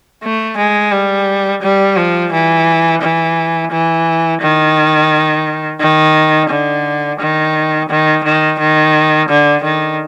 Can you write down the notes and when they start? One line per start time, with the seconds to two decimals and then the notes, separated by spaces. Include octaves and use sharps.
0.23 A3
0.58 G#3
0.92 G3
1.62 G3
1.97 F3
2.32 E3
3.02 E3
3.71 E3
4.41 D#3
5.80 D#3
6.50 D3
7.20 D#3
7.89 D#3
8.24 D#3
8.60 D#3
9.29 D3
9.64 D#3